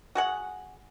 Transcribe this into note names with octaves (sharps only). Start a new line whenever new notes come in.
F#4 G#4 F#5